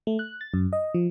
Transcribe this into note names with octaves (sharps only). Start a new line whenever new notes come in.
A3
F#6
A6
F#2
D#5
F3